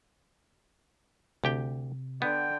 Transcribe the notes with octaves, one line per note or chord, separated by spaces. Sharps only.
D2 C3 G4 G5
D3 B3 G5